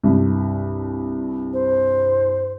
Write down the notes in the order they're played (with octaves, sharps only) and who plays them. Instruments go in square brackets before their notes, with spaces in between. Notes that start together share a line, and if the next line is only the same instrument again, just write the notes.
[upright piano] C2 G2
[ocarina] C5